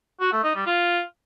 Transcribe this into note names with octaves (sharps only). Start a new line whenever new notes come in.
F#4
A3
D#4
G3
F4